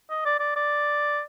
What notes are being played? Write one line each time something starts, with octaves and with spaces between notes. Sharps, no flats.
D#5
D5
D5
D5